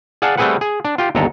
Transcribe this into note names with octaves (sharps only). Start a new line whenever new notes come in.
G#4 D5 F5 F#5 G#5 A5
G3 A3 C4 G#4 B4 F#5
G#4
D4
F4 G4
G1 D#2 G#3 A4 A#5